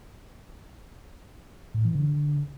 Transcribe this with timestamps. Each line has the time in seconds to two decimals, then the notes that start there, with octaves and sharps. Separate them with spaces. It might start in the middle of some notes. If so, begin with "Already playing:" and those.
1.74 A2
1.85 E3
1.95 D3